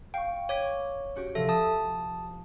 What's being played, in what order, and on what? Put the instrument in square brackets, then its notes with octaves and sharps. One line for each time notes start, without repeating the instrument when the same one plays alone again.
[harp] F5 C#6 [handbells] G5
[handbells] C#5 [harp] D6 G#6 B6
[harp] C#4 F#4 G4
[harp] C3 F3 [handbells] A4 E5
[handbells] A5 D#6